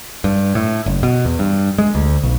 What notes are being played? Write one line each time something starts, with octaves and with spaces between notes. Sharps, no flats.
G2
A2
F#1
B2
E2
G2
G#3
D2
B1